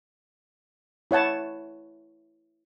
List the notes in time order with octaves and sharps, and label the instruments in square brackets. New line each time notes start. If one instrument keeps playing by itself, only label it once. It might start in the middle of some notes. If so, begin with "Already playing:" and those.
[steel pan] E4 C#5 F#5 A5